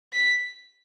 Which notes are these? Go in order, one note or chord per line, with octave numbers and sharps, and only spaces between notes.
B6